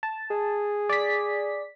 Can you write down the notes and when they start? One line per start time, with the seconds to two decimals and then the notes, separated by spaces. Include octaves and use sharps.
0.03 A5
0.30 G#4
0.89 D5 B6